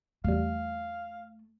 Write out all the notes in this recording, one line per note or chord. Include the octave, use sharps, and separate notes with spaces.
E2 G3 A3 F5